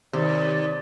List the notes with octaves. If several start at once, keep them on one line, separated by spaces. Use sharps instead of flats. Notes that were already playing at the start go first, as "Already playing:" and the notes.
D#2 C3 D5